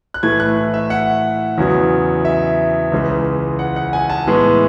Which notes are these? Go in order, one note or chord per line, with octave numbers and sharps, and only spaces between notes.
F#6
A2 E3 A3 G#6
F#6
E5
F#5
E2 C#3 F#3
E5
C#2 C#3 E3 G#3
F#5
F#5
G#5
A5
A2 E3 G#3 B3